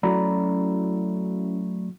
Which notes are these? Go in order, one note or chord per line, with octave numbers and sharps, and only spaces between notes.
F#3 A3 C#4 E4 F#4 D5 A#5 B5